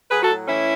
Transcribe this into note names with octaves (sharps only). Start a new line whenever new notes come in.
F#3 G#4 B4
F#4 A4
A2
E3 C#4 E4